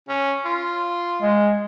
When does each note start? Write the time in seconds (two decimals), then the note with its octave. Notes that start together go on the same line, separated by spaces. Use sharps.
0.09 C#4
0.45 F4
1.22 G#3